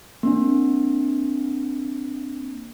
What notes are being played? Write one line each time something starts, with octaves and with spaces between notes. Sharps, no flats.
A#3 C4 D4